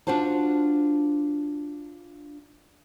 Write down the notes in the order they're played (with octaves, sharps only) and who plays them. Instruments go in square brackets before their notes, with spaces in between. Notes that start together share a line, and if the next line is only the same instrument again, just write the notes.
[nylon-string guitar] D4 F4 F#4 C5 A5